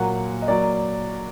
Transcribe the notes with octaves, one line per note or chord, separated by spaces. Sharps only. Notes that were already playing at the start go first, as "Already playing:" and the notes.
Already playing: A#2 F#3 A#3 F#5
D#5
F#3 A#3 D5